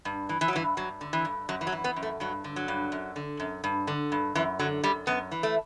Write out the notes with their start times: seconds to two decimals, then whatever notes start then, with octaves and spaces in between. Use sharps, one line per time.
0.05 G2
0.29 E3
0.41 E3
0.48 F#3
0.53 G2 E3
0.77 G2 F#3
1.01 D3
1.13 E3
1.25 G2
1.49 F#2 F#3
1.61 E3
1.67 F#3
1.73 E3
1.84 B3
1.96 F#2
2.03 A3
2.20 G2 F#3
2.44 D3
2.56 F#3
2.68 G2
2.92 F#2
3.16 D3
3.40 F#2
3.64 G2
3.87 D3
4.12 G2
4.35 F#2 E3
4.59 D3 F#3
4.83 F#2 G3
5.07 F#2 B3
5.31 E3
5.43 A3